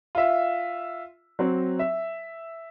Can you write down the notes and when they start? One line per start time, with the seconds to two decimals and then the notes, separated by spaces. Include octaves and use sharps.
0.15 F4 E5
1.39 F#3 C4
1.79 E5